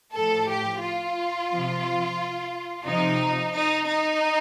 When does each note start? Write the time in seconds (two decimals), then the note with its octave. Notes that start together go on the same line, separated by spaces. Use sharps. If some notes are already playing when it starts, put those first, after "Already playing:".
0.15 A2 F3 A4
0.49 G4
0.83 F4
1.50 C3 F3
2.85 C3 F3 D#4
3.52 D#4
3.86 D#4